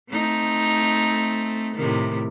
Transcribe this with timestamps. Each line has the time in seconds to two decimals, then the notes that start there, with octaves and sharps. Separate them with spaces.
0.11 A3 C4 D#4
1.76 A2 C3 D#3